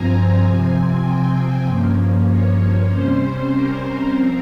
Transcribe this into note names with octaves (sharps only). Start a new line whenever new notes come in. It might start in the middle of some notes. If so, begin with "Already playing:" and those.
Already playing: G2 F3 C4 G#5 A#5
C3 F3 C4
G5
G2 F3 A#3 C#4
C#5
C3 G3 C#4 C5
A#4
F3 C4